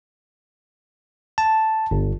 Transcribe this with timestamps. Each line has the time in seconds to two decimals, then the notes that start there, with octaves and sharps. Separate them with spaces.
1.38 A5
1.91 G1